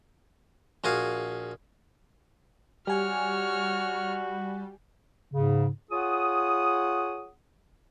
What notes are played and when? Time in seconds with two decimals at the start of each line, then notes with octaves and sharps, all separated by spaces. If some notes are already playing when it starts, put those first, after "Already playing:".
0.84 A#1 F#4 G#4 F5
2.87 G3 F#4 G4 C#5 G#5 F6
5.33 G#2 C#3
5.91 F4 G#4 C#5 F#5 D#6